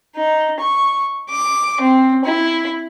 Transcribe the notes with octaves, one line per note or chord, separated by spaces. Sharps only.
D#4
C#6
D6
C4
E4